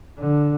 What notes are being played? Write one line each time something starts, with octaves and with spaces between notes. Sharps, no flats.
D3